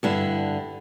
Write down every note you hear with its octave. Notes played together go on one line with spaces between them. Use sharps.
G2 D3 E4